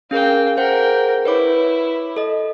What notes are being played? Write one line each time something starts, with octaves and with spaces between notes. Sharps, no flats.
C#4 G#4 A#4 F5 G5
G#4 A#4 C5 F#5 G5
E4 B4 C#5 D6
A4 D#5